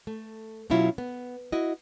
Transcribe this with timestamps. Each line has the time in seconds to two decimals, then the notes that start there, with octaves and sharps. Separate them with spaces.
0.07 A3
0.70 B2 F#3 C#4 E4 F4
0.98 B3
1.52 E4 F#4 D#5